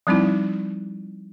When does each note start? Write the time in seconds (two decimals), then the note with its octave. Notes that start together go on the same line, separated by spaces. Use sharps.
0.07 F3 G3 C4 D#4 E4